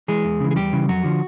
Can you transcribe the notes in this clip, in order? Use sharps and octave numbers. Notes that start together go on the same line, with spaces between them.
E3 G#3 G#4
E2
C#3 E3
G#4
E2 G3 G4
C#3 E3
F2 F#3 F#4
D3 F3